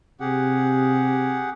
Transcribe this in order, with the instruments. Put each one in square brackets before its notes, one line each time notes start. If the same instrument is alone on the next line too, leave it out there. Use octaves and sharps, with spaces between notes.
[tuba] C3 [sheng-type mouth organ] G4 G#4 F#5